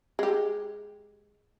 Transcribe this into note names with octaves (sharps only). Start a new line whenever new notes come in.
G#3 G4